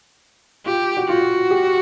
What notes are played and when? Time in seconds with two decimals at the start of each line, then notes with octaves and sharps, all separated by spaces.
0.66 F4 G4
0.97 F#4
1.08 F4 F#4
1.51 G4